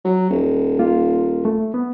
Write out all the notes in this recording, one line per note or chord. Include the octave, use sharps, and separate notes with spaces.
F#3
D#1
A#3 F4
A3
B3